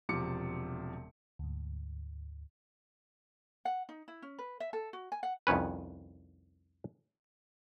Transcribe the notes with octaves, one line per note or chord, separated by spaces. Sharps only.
E1 C3 F3 D6 C#7
D2 G#2
F#5
D#4
E4
C#4
B4
E5
A4
F#4
G#5
F#5
C2 F2 D#3 C#4 B4